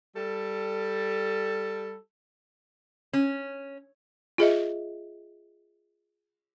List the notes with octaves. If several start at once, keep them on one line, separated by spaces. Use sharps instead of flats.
G3 A4
C#4
F4 G#4 D#5 E5